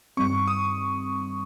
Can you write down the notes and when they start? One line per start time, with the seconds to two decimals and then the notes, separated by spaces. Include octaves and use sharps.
0.17 G2 D#3 G3 C4 C#6
0.48 D#6